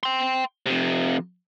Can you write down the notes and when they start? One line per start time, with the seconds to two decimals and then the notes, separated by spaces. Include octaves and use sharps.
0.03 G5 C6
0.66 F2 C3